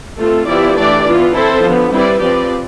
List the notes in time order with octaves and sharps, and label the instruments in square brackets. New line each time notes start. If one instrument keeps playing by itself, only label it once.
[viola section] A3 C4 F4 A4
F3 B3 E4 G4 D5
E3 A3 D4 G4 D5
E3 B3 F4
C4 E4 A4 C5
D3 F3 B3
G3 C4 E4 B4 D5
F3 C4 G4 B4 D5